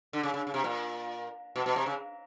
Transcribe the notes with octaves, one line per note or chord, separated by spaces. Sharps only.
D3
C#3
C#3
C#3
C3
A#2
B2
B2
C3
C#3